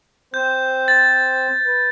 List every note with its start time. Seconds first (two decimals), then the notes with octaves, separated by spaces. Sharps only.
0.34 C4 C5 G6
0.88 A6
1.66 B4